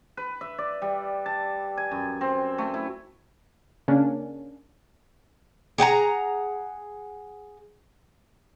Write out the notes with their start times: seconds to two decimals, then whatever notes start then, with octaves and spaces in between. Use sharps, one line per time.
0.17 B4
0.41 E5
0.58 D5
0.82 G3
1.26 A5
1.77 G#5
1.91 F#2
2.21 C4
2.58 A3
2.74 E4
3.88 C#3 A#3 C#4 D4
5.78 G#4 F#5 G5 A#5